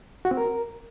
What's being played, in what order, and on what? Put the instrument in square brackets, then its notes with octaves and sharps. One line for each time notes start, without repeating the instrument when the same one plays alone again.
[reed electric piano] F#4
C4
A#4